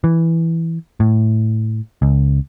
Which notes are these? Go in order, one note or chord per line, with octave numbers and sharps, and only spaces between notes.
E3
A2
C#2